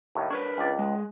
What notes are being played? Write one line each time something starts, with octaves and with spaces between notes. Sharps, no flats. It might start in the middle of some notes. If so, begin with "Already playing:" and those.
D#2 A2
D4 A#4 B4 C#5
C#2 D5
G#3